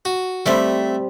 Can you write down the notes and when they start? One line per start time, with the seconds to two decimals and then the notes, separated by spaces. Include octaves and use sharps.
0.05 F#4
0.46 G3 A3 C4 E5